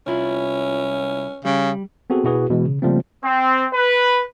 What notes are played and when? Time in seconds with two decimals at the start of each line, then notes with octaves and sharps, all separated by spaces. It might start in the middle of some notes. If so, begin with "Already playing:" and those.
0.07 C2 C#4 E4 F4
1.45 C#3 G3
2.10 B3 C4 F#4 G#4 A4
2.24 B2 E4 F#4 G#4 B4
2.49 B2 E3 G#3
2.65 C#3
2.82 C#3 F3 G3 A3 A#3 C4
3.24 C4
3.73 B4